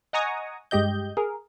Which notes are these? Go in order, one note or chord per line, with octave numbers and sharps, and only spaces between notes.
D#5 F#5 G#5 A#5 C#6 D#6
G2 G#3 G4 D#5 G6
G#4 A#4